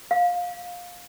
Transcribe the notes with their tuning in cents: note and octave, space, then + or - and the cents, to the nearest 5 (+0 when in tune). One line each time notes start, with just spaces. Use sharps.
F5 +20